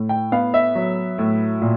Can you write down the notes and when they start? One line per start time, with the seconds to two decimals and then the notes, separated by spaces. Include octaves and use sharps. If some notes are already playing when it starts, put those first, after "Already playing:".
Already playing: A2
0.09 G5
0.32 B3 F5
0.54 E5
0.75 F#3
1.18 A2
1.62 A#2